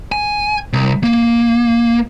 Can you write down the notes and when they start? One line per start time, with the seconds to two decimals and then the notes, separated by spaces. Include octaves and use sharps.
0.12 G#5
0.73 C2
1.03 A#3